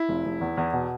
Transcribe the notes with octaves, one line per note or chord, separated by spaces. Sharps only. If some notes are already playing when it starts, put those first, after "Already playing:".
Already playing: E4
F1
F1
E2
E2
B2